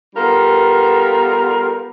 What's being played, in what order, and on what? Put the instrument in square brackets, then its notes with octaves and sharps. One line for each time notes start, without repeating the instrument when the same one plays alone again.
[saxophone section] G3 B3 F4 A4 A#4